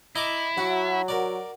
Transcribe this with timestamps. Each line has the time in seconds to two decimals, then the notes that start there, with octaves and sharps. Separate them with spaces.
0.16 E4 D#5 A#5 D6
0.58 F#3 F#4 E5
1.08 A#4 D5